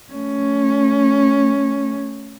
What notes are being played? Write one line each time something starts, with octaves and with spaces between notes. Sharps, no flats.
A3 C#4